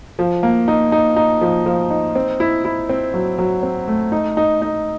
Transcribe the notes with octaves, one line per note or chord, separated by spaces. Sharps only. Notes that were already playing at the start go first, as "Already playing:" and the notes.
F3
A#3
D#4
D#4
D#4
F3
F3
D#4
C4
E4
E4
C4
F#3
F#3
C4
A3
D#4
D#4
D#4